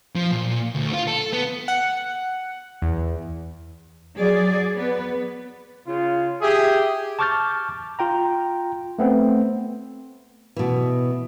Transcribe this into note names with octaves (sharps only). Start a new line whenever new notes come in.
F3
A#2
D2
F4
A4
B3
F#5
E2
F#3 G#4 D5
B3 B4
C#3 F4
G4 G#4 E5
A5 C#6 D6 F6 G6 A6
F4 G5 A#5
A3 B3 C4
B2 E3